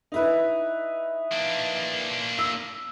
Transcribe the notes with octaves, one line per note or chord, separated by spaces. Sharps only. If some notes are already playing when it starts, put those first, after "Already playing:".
D#4 E4 B4
A#3 D4
E6